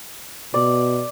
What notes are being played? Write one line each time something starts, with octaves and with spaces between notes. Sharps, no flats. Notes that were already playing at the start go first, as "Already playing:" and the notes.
B2 D5